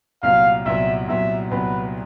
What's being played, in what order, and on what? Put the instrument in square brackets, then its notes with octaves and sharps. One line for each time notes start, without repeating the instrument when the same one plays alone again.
[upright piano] C2 A#2 F#3 B3 [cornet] F5
[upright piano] C2 A#2 F#3 B3 [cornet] E5
[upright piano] C2 A#2 F#3 B3 [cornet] E5
[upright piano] C2 A#2 F#3 B3 [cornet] B4